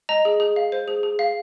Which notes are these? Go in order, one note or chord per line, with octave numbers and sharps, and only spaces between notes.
D#5 A#5
G#4
G#4
F5
C5
G#4
G#4
F5